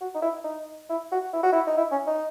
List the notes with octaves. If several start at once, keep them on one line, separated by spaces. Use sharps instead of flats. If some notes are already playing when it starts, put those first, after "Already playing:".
F#4
D#4
E4
D#4
E4
F#4
E4
F#4
E4
D#4
E4
C#4
D#4